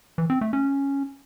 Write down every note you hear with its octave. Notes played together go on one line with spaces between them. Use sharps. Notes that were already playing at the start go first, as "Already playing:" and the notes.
E3
C4
A3
C#4